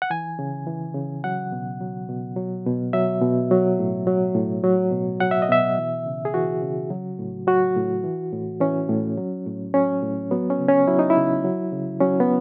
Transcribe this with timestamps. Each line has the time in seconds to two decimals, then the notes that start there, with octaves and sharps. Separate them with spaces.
0.02 F#5
0.10 E3 G#5
0.39 C#3
0.67 E3
0.95 C#3
1.24 F#3 F#5
1.52 B2
1.81 F#3
2.09 B2
2.36 F#3
2.66 B2
2.93 F#3 E5
3.22 B2
3.51 F#3
3.79 A2
4.07 F#3
4.35 A2
4.64 F#3
4.92 B2
5.20 F#3 F#5
5.31 E5
5.42 D#5
5.49 B2 E5
5.78 E3
6.06 C#3
6.25 G#4
6.34 E3 F#4
6.62 C#3
6.90 F#3
7.19 A2
7.47 F#3 F#4
7.76 A2
8.04 E3
8.33 A2
8.60 E3 C#4
8.89 A2
9.18 F#3
9.46 A2
9.74 F#3 C#4
10.03 A2
10.31 F#3 B3
10.50 C#4
10.59 C#3
10.68 C#4
10.87 F#3 E4
10.99 D#4
11.10 E4
11.17 C#3
11.44 F#3
11.73 C#3
12.01 F#3 C#4
12.20 B3